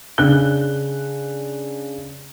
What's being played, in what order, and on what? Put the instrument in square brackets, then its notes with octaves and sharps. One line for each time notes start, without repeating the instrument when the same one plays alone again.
[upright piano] C#3 D4 F#6 G7